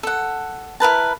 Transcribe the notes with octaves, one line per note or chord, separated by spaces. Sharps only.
A4 F#5
E4 A#4 B4 A5